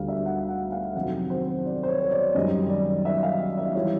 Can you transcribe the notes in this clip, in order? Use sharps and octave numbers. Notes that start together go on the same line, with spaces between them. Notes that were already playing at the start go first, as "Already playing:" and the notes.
Already playing: D2 D3 G3 F5
E5
F#5
F#5
F5
F2 C3 D#3 F#3 F#5
C5
D5
C5
C#5
C#5
D5
F#2 D#3 G3 D#5
D5
E5
F5
E5
E3 G3 C#5